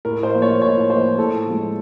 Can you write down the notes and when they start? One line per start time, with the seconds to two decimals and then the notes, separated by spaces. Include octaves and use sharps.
0.05 A2 A#4
0.23 C5
0.34 F3 A#3
0.42 C#5
0.61 A2 C#5
0.90 F3 A#3 C5
1.18 A2 A4
1.47 F3 G#3